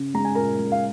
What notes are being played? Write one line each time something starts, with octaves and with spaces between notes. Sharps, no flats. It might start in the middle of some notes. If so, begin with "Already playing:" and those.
Already playing: C#3
G#3 A#5
G#5
A#2 A#4 A#5
G#3
F5